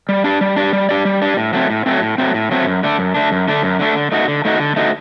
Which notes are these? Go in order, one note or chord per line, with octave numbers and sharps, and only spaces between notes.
G3
D4 G4 D5
G3
D4 G4 D5
G3
D4 G4 D5
G3
D4 G4 D5
A2
F#3 A3 C4
A2
F#3 A3 C4
A2
F#3 A3 C4
A2
F#3 A3 C4
F#2
D3 A3 D4
F#2
D3 A3 D4
F#2
D3 A3 D4
F#2
D3 A3 D4
D3
A3 D#4 F#4
D3
A3 D#4 F#4
D3
A3 D#4 F#4